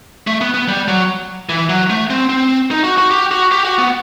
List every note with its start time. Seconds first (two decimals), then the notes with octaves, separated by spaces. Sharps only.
0.27 A3
0.41 B3
0.54 B3
0.68 G3
0.88 F#3
1.49 E3
1.69 F#3
1.90 A3
2.10 C4
2.29 C4
2.71 D#4
2.84 F#4
2.98 F#4
3.11 G4
3.31 F#4
3.52 G4
3.65 F#4
3.79 B3